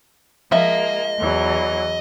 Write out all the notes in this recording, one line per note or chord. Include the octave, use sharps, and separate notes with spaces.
F3 G#3 A#3 D#5 E5
E2 E3 F#3